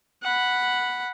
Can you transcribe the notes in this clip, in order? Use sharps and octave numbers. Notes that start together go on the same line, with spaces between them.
F#5 B5